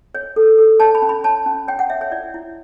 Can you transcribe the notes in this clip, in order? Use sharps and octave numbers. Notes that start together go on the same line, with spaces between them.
C#5
A4
A4
C#5 A5
B5
C#4
B5
C#5 A5
C#4
C#5 G5
F#5
C#5 E5
C#5
E4 D5
E4